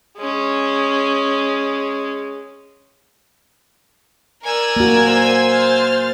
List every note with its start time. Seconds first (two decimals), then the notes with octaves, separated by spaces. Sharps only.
0.18 G#3 C#4
4.44 A#4 D5 G#5 E6
4.76 A#3 F#4
5.07 C5
5.50 F6 A6